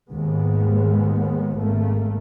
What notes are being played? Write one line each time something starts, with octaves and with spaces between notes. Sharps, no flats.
D#2 G#2 G#3 B3
G#1 A3 A#3